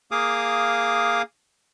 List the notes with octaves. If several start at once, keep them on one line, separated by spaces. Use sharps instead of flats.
A#3 G#4 F5 D6 D#6